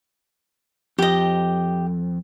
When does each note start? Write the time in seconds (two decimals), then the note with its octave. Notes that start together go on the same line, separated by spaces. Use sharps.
0.99 F2 G4 D#5